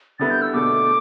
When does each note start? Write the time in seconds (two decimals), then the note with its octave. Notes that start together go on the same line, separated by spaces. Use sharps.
0.19 D3 G3 B3 E4 A4 A6
0.30 G6
0.42 E6
0.53 B2 A3 D4 A4 D6